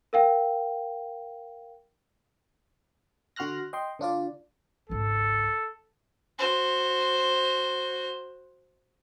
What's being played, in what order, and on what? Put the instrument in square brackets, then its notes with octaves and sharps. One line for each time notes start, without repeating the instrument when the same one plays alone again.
[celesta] A#4 F5 G5
[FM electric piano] D3 F#4 C6 F6 F#6 A#6
D#5 G5 C6
D3 D4 F4 D5
[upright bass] G#1 C#2 [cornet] A4
[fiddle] F#4 C5